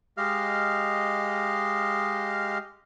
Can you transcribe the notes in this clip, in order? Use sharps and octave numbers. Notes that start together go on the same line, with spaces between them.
G#3 G4 D#5 F5 F6